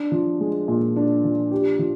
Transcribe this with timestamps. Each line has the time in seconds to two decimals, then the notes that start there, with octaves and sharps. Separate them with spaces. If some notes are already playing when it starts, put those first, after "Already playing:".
Already playing: D4
0.12 F3
0.40 G#3
0.68 A#2
0.96 D4
1.24 F3
1.51 G4
1.79 F3